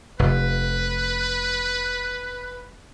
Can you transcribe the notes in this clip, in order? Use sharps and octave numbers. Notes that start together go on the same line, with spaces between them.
F1 B4